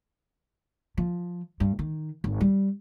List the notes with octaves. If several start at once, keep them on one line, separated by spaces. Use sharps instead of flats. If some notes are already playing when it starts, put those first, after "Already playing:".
F3
G2
D#3
G#1
G3